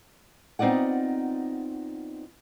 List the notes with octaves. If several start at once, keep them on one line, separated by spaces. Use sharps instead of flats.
B3 C4 D#4 F4 D5 F#5